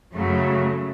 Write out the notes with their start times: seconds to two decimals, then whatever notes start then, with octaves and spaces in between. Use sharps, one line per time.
0.14 F#2 C#3 F#3 A3